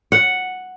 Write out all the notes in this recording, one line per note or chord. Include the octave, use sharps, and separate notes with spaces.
F#5